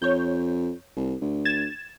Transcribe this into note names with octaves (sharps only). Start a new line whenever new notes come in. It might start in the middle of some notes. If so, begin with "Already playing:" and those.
F2 C#5 G6
C2
D2
G#6 A6 E7